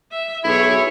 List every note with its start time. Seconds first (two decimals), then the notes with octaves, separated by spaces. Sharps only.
0.12 E5
0.44 B1 E4 G#4 C#5